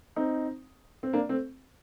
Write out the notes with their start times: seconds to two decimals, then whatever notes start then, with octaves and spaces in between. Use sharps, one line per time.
0.16 C4 D#4
1.03 C4
1.13 A#3 D4
1.29 A3 C4